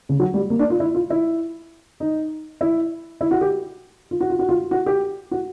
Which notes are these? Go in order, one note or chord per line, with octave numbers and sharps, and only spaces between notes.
C#3
F#3
G3
A#3
D4
F4
E4
F4
E4
D#4
E4
E4
F#4
G4
F4
F#4
F4
F#4
F4
F#4
G4
F#4